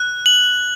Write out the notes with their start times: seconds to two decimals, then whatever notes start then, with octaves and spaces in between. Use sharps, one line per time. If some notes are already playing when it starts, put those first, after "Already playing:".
Already playing: F#6
0.26 F#7